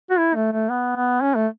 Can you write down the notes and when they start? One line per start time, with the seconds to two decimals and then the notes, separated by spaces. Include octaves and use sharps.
0.10 F#4
0.18 E4
0.35 A3
0.53 A3
0.70 B3
0.96 B3
1.21 C#4
1.36 A3